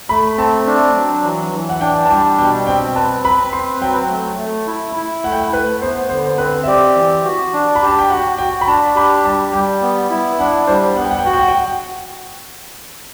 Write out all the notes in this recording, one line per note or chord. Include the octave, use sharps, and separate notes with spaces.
A3 B5
C4 A5
D4
F#3
E3
E3
F#5
D4 G5
A5
G3 G5
B2 G5
C4 G5
B4 A5
B4 B5
C4 C6
F#3 G5
A3
A3
E4
E4
A3 F#5
G5
F#5
A3 B4
B3 C5
D3 C5
C4 B4
E5
G4 D5
E3
F#4
D4
B5
G4 A5
G5
F#4 F#5
F#4 G5
B5
D4 A5
G4 B5
G3 A5
G3 G5
B3
E4
D4 F#5
G3 C5
B3 F#5
G5
F#5
G5
F#4 F#5
G5
F#5
G5